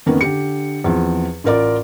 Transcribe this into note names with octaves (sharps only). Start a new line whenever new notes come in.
F2 D#3 A#3 B3 C#4
D3 G4 C#7
E2 F3 C4
A1 F4 A#4 D5 D6